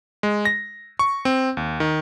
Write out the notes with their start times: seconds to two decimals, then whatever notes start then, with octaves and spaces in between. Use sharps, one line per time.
0.23 G#3
0.45 A#6
0.99 C#6
1.25 C4
1.57 D#2
1.80 D#3